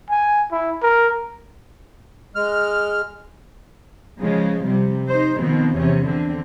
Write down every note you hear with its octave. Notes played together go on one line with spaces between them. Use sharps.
G#5
E4
A#4
G#3 F6
C#3 F3 G#3
C3 G3
D#4 C5
B2 D#3 F3 C4
E2 C3 C#4
D3 C4